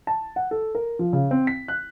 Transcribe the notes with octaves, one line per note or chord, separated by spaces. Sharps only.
A5
F#5
A4
A#4
F3
C#3
C4
B6
F#6